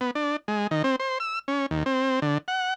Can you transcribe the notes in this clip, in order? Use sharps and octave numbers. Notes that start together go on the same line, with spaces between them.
B3
D4
G#3
D#3
C4
C5
E6
C#4
D#2
C4
D3
F#5